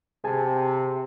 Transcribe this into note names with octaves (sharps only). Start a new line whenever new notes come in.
C3 G#4 G#5 A5